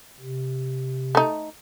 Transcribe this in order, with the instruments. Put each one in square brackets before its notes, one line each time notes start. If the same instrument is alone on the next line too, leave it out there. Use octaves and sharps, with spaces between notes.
[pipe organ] C3
[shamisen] A3 D#4